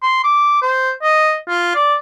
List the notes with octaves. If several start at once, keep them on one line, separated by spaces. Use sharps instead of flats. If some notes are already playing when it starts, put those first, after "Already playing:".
C6
D6
C5
D#5
F4
D5